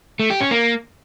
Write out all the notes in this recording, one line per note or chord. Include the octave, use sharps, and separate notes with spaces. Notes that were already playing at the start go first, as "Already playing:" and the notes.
A3
G4
C#4
A#3